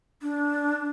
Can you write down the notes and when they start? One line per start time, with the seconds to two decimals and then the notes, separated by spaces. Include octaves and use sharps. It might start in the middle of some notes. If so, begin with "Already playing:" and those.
0.22 D4